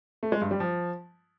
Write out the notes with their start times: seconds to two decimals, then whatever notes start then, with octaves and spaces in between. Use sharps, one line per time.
0.23 A3
0.32 G#3
0.41 G2
0.51 G3
0.60 F3